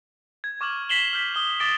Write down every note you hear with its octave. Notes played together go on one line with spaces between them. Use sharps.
G#6
C#6 D6 F6 G#6 F#7
G#6 B6 C7 E7 F#7 G7
F6 G6 B6
D#6 G7
D6 D#6 A6 A#6 D7 G7